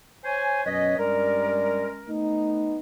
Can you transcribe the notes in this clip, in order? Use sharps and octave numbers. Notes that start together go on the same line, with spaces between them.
C5 C#5 G#5
F#2 B2 C#4 B4 C#5 D#5
G2 G3 G#3 C#4 A#4 D5
A3 B3 D#4